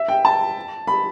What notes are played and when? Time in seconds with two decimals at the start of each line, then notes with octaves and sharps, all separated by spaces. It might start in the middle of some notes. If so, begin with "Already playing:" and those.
Already playing: E5
0.08 G5
0.25 A5
0.87 B5